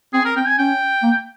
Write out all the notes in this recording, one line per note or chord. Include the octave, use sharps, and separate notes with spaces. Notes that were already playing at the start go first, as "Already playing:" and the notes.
C4 G#4
A#4
C4 G5
G#5
C#4 G5
A#3